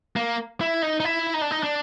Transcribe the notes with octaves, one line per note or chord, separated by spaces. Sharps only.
A#3
E4
D#4
D#4
E4
D#4
D4
D#4
D4